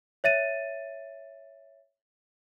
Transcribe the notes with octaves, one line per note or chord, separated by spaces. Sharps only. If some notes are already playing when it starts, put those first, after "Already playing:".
C#5 E5 A6 D#7